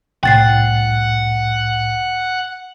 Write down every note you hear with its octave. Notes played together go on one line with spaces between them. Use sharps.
C2 A2 F#5 G5 A6 C7